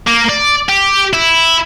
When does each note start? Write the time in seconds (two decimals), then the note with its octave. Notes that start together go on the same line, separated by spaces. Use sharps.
0.07 A#3
0.29 D5
0.69 G4
1.13 E4